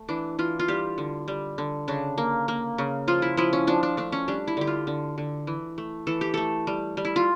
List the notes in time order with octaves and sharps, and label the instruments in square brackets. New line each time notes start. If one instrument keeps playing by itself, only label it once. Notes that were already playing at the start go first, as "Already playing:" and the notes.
Already playing: [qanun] A3
E3 D4
E3 F4
F4
G3 G4
D3
G3
D3
C#3 D4
A#3
A#3
C#3
F3 F4
E4
F3 E4
C#4
F3 D4
D4
A3 D4
C#4
G3 D4
E4
D3 G4
F4
D3
D3
E3
A3
E3 A4
G4
A3 A4
G3
G3
E4
F4